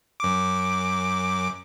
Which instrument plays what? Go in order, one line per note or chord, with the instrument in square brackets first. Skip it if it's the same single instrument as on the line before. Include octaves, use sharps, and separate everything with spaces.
[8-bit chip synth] F#2 D6